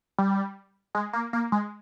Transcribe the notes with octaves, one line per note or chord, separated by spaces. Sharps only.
G3
G#3
A#3
A#3
G#3